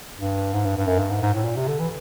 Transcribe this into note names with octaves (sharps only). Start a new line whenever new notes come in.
G2
G#2
G2
G2
F#2
G2
G#2
G#2
A2
A#2
C3
D3
E3